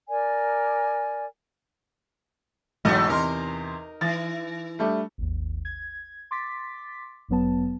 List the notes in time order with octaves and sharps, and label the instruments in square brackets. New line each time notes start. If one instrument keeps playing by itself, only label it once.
[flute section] A#4 D5 G#5
[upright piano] B1 E2 G#2 [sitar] F#3 A3 D#5
[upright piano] E2 C3 C6 [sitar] D#4 A#4
[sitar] E3 [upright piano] A6
[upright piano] G3 A3 D4
[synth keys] G#1 D#2
G#6
C6 D6 A6 B6
G1 F#2 F#3 B3 A5